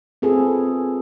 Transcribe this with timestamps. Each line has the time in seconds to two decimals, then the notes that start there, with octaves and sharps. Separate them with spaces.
0.22 C4 F4 G#4 A4 B4